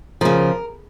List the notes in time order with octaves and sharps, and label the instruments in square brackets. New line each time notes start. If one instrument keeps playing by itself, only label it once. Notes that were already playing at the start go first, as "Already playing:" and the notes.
[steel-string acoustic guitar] C#3 F3 A#4